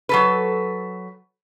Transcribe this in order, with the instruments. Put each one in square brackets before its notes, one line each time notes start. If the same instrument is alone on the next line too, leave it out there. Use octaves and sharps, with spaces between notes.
[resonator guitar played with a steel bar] F#3 A4 B4